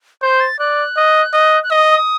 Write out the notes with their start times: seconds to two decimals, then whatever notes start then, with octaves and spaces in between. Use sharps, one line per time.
0.22 C5 G6
0.40 A6
0.59 D5 F#6
0.97 D#5
1.34 D#5
1.63 F#6
1.70 D#5 D#6
1.89 D#6